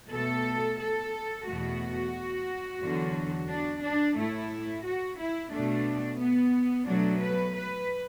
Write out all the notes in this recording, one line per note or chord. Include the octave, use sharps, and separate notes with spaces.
B2 A3 A4
A4
E2 B2 A3 F#4
E2 D3 F#3
D4
D4
A2 A3 E4
F#4
E4
B2 A3 D4
B3
B2 F#3 A3 D4
B4
B4